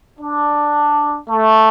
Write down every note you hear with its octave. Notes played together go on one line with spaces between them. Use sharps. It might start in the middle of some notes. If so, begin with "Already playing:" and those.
D4
A3